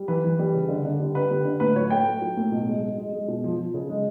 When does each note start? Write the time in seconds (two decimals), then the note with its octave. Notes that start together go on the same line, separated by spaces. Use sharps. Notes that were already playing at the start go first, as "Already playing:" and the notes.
Already playing: G3
0.08 E3 B4
0.24 E3
0.39 G3
0.54 C#3
0.69 D3
0.85 D3
1.00 G3
1.15 D3 B4
1.31 G3
1.45 D3
1.60 A2 B4
1.76 F#3 C#5
1.90 A3 G5
2.07 A3
2.22 F#3
2.37 A2
2.52 B2
2.68 G#3
2.83 G#3
2.98 G#3
3.13 G#3
3.28 B2
3.44 F3
3.59 F3
3.74 C#3
3.90 G#3